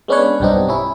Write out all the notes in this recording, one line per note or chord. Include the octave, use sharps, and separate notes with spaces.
G#3 B3 C#4 D4 B4 C#5
B1 G2 B3 C4 D4 D#4
C#4 E4